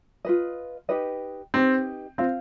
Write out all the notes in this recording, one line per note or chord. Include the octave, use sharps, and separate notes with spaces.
F4 B4 D#5
D#4 G4 B4 D#5
C4 D#4 G4 B4 D#5
C4 F4 C5 F5